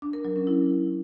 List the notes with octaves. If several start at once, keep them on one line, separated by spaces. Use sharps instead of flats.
D4
A#4
F#3
C#4
E4